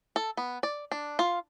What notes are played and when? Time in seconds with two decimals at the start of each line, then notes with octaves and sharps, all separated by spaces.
0.16 A4
0.37 B3
0.63 D5
0.92 D4
1.19 F4